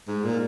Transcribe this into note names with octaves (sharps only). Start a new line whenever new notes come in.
G#2
A#2